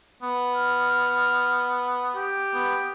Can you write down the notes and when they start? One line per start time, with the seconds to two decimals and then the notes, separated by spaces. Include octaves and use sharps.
0.23 B3
0.55 F6
2.16 G4
2.54 B3